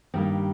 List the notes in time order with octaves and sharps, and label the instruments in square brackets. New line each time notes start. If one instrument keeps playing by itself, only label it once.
[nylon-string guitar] G2 D#3 G3 A#3 C4